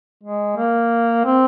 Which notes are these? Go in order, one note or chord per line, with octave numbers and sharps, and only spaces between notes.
G#3
A#3
C4